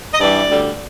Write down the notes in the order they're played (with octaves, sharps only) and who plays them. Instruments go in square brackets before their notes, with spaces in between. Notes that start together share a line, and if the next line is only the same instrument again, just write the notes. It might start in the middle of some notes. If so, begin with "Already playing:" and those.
[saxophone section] D#5
G2 E3 G3 D5
D2 D3 G3